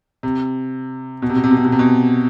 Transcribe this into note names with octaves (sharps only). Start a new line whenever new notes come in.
C3
B2
C3
B2
C3
B2
C3
B2
C3
B2